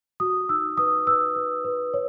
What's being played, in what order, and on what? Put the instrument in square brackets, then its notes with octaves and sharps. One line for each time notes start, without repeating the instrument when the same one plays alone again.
[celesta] F#4 D#6
D#4 E6
B4 D#6
B4 E6
B4
B4
C#5